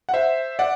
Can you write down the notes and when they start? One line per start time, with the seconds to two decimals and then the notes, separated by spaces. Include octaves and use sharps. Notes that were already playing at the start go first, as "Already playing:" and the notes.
0.09 F#5
0.13 C5 E5
0.59 D5 F#5